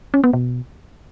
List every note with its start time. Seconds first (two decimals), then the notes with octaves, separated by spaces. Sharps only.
0.14 C#4
0.24 B3
0.33 B2